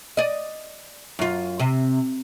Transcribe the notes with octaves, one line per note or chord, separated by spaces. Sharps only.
D5 D#5
F#2 F4
C3